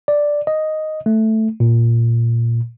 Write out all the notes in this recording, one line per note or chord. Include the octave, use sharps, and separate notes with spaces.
D5
D#5
A3
A#2